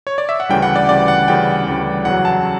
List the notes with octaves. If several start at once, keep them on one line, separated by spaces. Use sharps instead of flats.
C#5
D5
E5
F#5
D2 C#3 E3 G3 G5
F#5
D5
D2 C#3 E3 G3 D5
F#5
D2 C#3 E3 G3 G5
D2 C#3 E3 G3
E2 C#3 F#3 F#5
A5